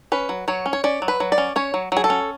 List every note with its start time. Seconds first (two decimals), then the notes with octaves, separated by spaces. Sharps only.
0.12 C#4 B4
0.29 F#3
0.48 F#3 C#5
0.66 C#4
0.73 C#5
0.84 C#4 D5
1.02 F#3
1.08 B4
1.20 F#3
1.32 D5
1.38 C#4
1.56 C#4 C#5
1.74 F#3
1.92 F#3 G#4
2.04 A4
2.10 C#4